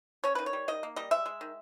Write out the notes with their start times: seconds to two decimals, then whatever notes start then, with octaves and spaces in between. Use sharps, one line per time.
0.24 C#4 C#5
0.35 D#3 B4
0.46 C#5
0.53 G3
0.68 D#3 D#5
0.83 A#3
0.96 G3 D#5
1.11 G#3 E5
1.26 G#3
1.41 D#3